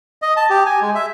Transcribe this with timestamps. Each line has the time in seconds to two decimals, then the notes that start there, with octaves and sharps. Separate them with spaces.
0.22 D#5
0.37 A5
0.50 G4
0.66 G#5
0.82 G#3
0.95 E5